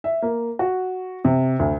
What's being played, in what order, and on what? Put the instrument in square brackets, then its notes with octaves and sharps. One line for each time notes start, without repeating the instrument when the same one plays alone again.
[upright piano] E5
A#3
F#4
C3
D2